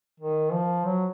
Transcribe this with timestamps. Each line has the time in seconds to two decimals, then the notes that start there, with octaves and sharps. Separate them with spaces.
0.20 D#3
0.52 F3
0.85 F#3